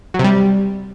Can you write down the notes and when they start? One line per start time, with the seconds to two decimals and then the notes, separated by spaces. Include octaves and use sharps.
0.14 F#3
0.19 C3
0.24 G3